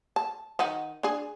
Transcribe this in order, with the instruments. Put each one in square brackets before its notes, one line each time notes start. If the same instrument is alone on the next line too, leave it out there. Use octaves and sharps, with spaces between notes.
[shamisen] A5
D#3 D#4 F#5
D4 G#4